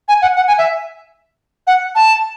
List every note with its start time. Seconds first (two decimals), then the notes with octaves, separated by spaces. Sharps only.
0.08 G#5
0.22 F#5
0.36 F#5
0.48 G#5
0.58 E5
1.67 F#5
1.95 A5